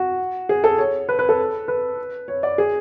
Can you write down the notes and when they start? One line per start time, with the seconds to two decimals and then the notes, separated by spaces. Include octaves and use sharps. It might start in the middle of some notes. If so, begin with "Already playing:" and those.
Already playing: F#4
0.49 G#4
0.64 A4
0.78 C#5
1.09 B4
1.19 B4
1.29 A4
1.68 B4
2.28 C#5
2.43 D5
2.58 G#4